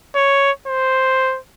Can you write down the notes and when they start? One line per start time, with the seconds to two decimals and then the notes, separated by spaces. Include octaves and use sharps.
0.15 C#5
0.67 C5